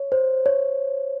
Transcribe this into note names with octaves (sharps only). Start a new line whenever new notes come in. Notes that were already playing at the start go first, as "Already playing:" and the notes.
Already playing: C#5
C5
C#5